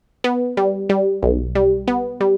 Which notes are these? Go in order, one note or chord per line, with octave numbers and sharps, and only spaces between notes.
B3
G3
G3
B1
G3
B3
G3